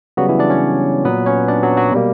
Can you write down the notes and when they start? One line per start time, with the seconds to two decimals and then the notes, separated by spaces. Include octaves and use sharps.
0.17 C#3 F#3 G3 B3 F#4
0.29 E3 E4
0.39 D4 D5
0.50 C#4 C#5
1.05 A#2 F#3 B3 B4
1.26 C#4 C#5
1.48 D4 D5
1.63 F#3 F#4
1.77 F#3 F#4
1.92 B2 G3 A#3